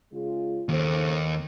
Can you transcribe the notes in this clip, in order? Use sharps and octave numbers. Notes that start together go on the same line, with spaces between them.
C#3 G#3 F4
D#2 C#3 A4 C5